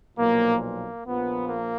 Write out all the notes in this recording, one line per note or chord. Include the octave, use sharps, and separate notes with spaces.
B1 A#2 F3 A#3
A#3
A#1 A#2 F3 B3
A#3